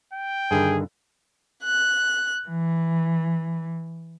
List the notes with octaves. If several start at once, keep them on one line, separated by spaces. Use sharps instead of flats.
G5
G2 D3 D#3 G#4
F#6
E3